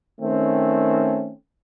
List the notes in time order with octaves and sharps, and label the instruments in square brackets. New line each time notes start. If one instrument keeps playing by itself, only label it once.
[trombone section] D#3 A3 C4 C#4